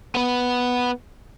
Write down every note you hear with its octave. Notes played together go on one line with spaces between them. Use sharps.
B3 B4